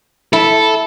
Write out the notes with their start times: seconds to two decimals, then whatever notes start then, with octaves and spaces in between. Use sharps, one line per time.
0.33 E4 A4